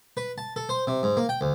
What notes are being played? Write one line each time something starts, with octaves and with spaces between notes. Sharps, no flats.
B4
A5
A4
C5
C3
G#2
A#3
G5
D2